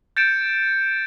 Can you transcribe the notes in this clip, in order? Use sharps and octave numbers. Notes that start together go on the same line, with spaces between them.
G6 A6 C#7 D7 E7